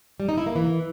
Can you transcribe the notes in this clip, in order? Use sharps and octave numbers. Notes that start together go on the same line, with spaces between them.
G3
D#4
E4
A#3
E3